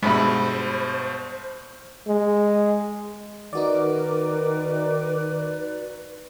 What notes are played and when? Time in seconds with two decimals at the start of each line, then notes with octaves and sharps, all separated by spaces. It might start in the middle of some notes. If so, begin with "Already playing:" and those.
0.03 G2 B2 G#3 B3 C5 D5 E5 B5
2.07 G#3
3.53 D#3 D#4 F#4 A#4 B4 D5 D6